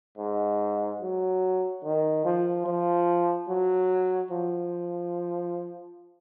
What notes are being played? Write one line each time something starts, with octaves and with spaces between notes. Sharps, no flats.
G#2
F#3
D#3
F3
F3
F#3
F3